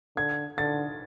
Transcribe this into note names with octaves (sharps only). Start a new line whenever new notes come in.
D3 G#6
D3 A6